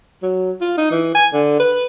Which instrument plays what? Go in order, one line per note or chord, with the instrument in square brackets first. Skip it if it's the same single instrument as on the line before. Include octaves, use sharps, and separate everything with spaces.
[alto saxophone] F#3
F4
D#4
E3
G#5
D3
B4